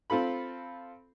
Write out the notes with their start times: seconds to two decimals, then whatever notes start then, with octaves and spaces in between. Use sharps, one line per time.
0.10 C4 F4 A4 B5